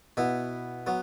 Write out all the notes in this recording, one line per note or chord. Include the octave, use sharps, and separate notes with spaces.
B2 B3 E4
F#3 B3